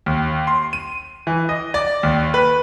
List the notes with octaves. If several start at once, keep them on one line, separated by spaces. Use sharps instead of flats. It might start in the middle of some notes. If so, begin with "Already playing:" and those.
D#2
C6
D#7
E3
D#5
D5
D#2
B4